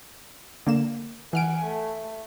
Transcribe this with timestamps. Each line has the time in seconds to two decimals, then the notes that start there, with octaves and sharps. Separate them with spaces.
0.67 D3 A#3 E7
1.33 E3 F#5 G#5 F6 D7
1.64 A3